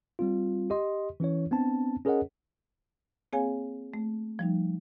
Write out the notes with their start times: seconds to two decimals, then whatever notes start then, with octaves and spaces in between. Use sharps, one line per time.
0.19 G3 C4 F4
0.70 G4 D#5 C6
1.20 E3 C#4 E4 C#5
1.51 B3 C4 D4 A5
2.05 C#4 G#4 A#4 C#5 D#5 F#5
3.33 A#3 C4 G#4 C#5 F5 G#5
3.94 A3
4.39 F3 G3 D#4